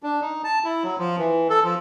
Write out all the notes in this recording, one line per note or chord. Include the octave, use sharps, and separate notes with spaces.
D4
D#4
A5
E4
F#3
F3
E3
A4
F3